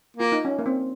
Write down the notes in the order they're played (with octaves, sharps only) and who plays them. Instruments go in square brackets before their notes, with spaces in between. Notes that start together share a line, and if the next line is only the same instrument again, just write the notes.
[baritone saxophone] A#3 [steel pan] F4
[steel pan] D#4
C#4
A#3
C4